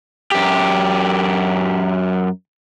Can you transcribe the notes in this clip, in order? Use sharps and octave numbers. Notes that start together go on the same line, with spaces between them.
F#2 G4